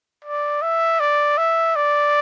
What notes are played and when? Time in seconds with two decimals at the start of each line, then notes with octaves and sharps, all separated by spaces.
0.25 D5
0.62 E5
1.00 D5
1.38 E5
1.76 D5